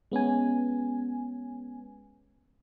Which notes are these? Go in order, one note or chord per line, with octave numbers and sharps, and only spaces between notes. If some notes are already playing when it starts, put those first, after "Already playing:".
G#3 B3 C#4 G#5